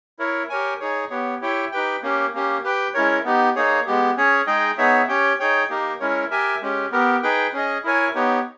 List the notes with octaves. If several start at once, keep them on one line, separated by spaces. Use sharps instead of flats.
E4 A#4 C#5
G4 A#4 C#5 G#5
D#4 G#4 C#5
B3 G4 C#5
E4 G4 C#5 G5
D#4 G4 B4 G5
A#3 C#4 G4
A#3 C#4 G4
G4 B4 G5
G#3 C#4 E4 A#4 C#5
B3 D#4 G4
A#3 D#4 G#4 C#5
G#3 B3 G4
C#4 G#4 C#5
G#3 D#4 G#4 D#5 G5
B3 D#4 G#4 C#5 E5
C#4 G4 C#5 G5
D#4 G#4 C#5 G5
A#3 D#4 G4 A#4
G#3 C#4 E4 A#4 C#5
G4 A#4 E5 G#5
G#3 C#4 G4
B3 G4 A#4
D#4 G#4 B4 G5
C#4 G#4 D#5
E4 A#4 C#5 G#5
B3 D#4 G4 C#5